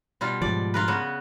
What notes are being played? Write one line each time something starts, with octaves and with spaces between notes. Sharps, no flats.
B2 G3 F4
G#2 F3 D5
F4 A#4 B4
C#3 B3 F#4